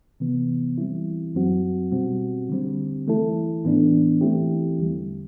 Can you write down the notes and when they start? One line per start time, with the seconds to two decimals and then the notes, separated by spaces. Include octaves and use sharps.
0.20 C3 E3 B3
0.78 E3 G3 C4 E4
1.35 F#2 F#3 C4 F#4
1.92 B2 G3 C4 F#4
2.50 D3 G3 C4
3.07 E3 A3 E4 A4
3.64 A2 E3 B3 D4
4.21 E3 A3 C4 E4 G4
4.79 E2 D3 G3